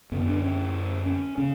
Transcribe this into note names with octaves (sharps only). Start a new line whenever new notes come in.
F#2 D3 B3
D4
C#4
C#4
C#3 C#4